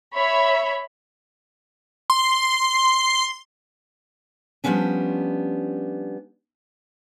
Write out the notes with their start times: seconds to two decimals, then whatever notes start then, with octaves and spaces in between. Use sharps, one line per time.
0.14 C#5 E5 B5
2.10 C6
4.64 F3 G3 A#3 B3 C#4 D4